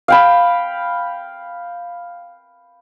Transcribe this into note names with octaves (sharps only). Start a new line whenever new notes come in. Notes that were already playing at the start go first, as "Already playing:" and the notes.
F5 G5 B5